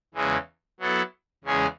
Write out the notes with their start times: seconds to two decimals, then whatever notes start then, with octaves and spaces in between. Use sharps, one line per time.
0.14 E2 C#3 E3 G#3
0.80 F#3 B3 E4 A4
1.44 E2 C#3 G#3 C#4 G#4